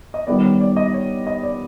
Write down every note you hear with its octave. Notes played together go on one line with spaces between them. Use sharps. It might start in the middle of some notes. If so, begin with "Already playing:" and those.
D#5
D#3 G3 B3 D5
C#5
D5
D#5
C#5
D#5
D5